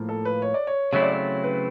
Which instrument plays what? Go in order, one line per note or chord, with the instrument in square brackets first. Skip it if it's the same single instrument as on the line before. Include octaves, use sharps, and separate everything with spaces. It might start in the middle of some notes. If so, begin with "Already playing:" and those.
Already playing: [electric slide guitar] A2 F3 A#3
[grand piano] A4
B4
C#5
D5
C#5
[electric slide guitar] C#3 F#3 A3 C4 E4 [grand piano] C#5
[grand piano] D5
C#5
B4